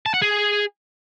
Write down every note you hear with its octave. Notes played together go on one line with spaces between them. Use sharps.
A5
F#5
G#4